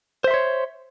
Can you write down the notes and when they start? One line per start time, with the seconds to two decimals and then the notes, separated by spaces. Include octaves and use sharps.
0.24 C5
0.28 E5
0.31 C6
0.34 C#5